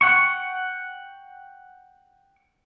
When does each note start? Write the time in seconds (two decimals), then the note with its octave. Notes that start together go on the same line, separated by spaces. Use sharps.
0.01 F#5 G5 C#6